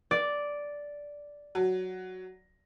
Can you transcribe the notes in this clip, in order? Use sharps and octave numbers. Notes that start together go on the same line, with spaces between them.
D5
F#3